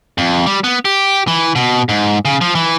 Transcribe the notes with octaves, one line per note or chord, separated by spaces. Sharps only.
F2
G3
B3
G4
E3
B2
G#2
C#3
F3
E3